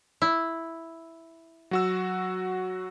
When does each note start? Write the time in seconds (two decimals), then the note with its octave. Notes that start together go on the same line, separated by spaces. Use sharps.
0.22 E4
1.71 F#3 F#4 E6